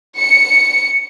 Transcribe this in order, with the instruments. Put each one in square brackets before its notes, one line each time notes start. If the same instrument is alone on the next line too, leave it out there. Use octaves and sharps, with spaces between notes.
[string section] C#7